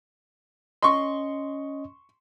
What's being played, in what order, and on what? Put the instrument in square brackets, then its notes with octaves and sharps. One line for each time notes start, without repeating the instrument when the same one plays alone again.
[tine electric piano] C#4 D#5 [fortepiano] C6 C#6